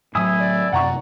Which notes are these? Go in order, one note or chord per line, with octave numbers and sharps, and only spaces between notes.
A2 F#3 E4 G#5 D#6
D5
F#2 C3 F#5 A#5 C#6